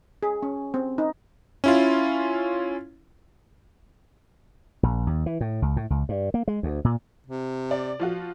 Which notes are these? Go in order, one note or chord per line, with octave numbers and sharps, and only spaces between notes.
G#4
C#4
C4
D#4
C#4 E4 F4
A#1
D#2
E3
A2
C#2
A2
C#2
G2
A#3
G#3
D2
A#2
C3
D5
F3 F4 F#4